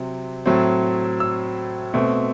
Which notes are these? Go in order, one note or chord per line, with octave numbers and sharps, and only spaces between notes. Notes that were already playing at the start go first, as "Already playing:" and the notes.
Already playing: C3 F#3 C4
A2 F#3 A3 C4
E6
B2 A3 C4